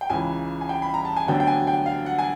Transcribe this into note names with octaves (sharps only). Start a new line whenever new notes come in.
G5
C#2 C#3 E3 G#5
G#5
G5
B5
A#5
A5
G#5
D2 D3 F#3 B3 D4 G5
G5
G#5
G5
F5
F#5
G#5